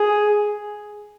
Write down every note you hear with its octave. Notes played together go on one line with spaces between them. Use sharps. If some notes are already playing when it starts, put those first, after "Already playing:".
Already playing: G#4